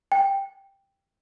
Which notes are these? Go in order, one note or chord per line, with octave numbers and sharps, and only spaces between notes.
G5